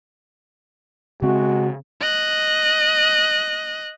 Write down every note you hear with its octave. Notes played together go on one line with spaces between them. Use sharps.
C#3 G#3 C4 F#4
D#5 F#6